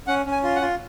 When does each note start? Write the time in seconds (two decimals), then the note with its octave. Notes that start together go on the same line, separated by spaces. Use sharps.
0.07 C#4 F#5
0.26 C#4
0.31 G#5
0.43 F4
0.55 F#5
0.61 F4